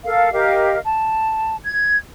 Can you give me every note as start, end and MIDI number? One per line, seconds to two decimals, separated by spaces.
0.05 0.29 69
0.05 0.29 70
0.05 0.29 77
0.33 0.78 67
0.33 0.78 70
0.33 0.78 75
0.33 0.78 77
0.84 1.56 81
1.64 1.98 92